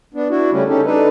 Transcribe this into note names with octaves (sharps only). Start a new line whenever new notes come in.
B3 D4
D4 E4 F#4
C#3 G3 A3 C#4
C#4 D#4 G4 A4
D4 D#4 A4 B4